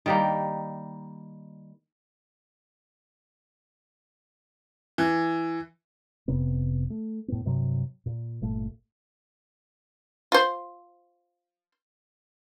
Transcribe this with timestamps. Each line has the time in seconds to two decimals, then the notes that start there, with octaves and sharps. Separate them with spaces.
0.06 D#3 G3 A#3
4.98 E3
6.28 F1 C3 B3
6.90 A3
7.28 A2 B3
7.45 G2 C3 F#3
8.06 A#2
8.41 G1 A#2 A3
10.32 F4 C5